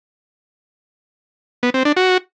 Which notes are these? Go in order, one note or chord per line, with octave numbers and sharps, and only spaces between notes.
B3
C4
D4
F#4